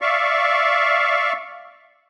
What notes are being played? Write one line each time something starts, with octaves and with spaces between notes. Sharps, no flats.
D5 E5 F5 C#6